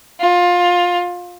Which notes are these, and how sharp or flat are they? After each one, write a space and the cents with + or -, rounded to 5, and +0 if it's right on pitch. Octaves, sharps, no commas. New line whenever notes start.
F4 +20